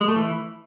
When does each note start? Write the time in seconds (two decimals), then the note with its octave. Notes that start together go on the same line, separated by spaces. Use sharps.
0.01 G#3
0.08 A3
0.16 E3